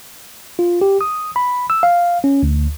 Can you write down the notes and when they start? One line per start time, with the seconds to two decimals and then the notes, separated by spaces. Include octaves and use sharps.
0.59 F4
0.81 G4
1.01 D#6
1.36 B5
1.70 E6
1.83 F5
2.24 C#4
2.43 D2